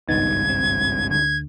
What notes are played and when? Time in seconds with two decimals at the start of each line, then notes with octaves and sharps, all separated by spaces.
0.09 G#1 C#2 G2 B3 D#4 G#6 A6
0.49 C4
1.10 D2 D3 G#6